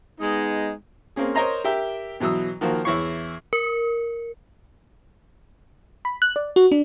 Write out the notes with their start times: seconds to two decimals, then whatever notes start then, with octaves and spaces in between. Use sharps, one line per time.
0.20 G#3 B3 D#4
1.16 A#3 C4 C#4 G#4
1.35 A#4 C5 C#5 D#5 A#5 C6
1.64 G4 A#4 E5 G5
2.20 B2 E3 F#3 D#6 E6
2.61 D#3 F3 A#3 F#4
2.85 E2 E4 C#5 C#6
3.53 A#4
6.05 B5
6.22 F#6
6.36 D5
6.56 F#4
6.72 D4